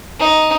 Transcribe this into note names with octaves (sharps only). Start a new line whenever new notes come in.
D#4